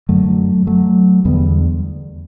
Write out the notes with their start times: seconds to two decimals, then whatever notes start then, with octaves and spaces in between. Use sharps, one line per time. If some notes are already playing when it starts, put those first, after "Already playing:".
0.09 F#2 D3 F#3 A3
0.67 F#3 A3
1.25 E2 D3 G3 B3